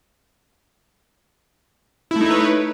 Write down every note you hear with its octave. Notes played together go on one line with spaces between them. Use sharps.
A3 D#4 E4 B4 C#5